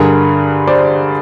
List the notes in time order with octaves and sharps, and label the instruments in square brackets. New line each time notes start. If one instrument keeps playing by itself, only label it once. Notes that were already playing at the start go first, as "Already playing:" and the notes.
Already playing: [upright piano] G2 D3 G#4 A#4
C5 D5